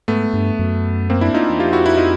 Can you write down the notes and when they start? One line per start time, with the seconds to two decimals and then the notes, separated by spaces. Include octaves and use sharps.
0.08 G#2 A3 B3
0.33 G2
0.59 F#2
1.10 A#3 C4
1.21 D4 E4
1.34 D#4 F4
1.49 E2
1.59 F2 F4 G4
1.73 E4 F#4
1.86 E4 F#4
1.97 D#4 F4